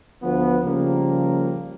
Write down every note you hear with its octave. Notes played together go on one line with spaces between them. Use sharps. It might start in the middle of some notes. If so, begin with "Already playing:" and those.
D2 F3 B3
C#3 F3 G3 A#3